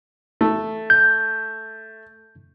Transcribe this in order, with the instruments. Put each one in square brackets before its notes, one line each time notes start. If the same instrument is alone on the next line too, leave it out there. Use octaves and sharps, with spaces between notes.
[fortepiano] A3
[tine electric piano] G6